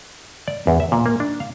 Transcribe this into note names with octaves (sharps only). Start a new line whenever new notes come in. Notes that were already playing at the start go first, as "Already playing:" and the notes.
D5
E2
E5
A#2
A#3
D4
F5